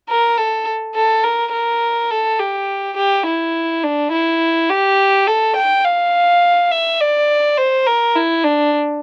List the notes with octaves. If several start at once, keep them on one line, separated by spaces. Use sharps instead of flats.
A#4
A4
A4
A#4
A#4
A4
G4
G4
E4
D4
E4
G4
A4
G5
F5
E5
D5
C5
A#4
E4
D4